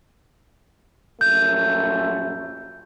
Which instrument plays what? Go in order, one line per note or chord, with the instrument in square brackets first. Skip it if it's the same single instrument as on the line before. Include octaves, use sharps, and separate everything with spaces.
[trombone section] A#1 F#2 A3 [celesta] G6